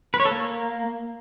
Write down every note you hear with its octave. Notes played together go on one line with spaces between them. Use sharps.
B4
C#5
A4
A#3